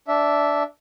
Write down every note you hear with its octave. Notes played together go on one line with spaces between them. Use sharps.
D4 E5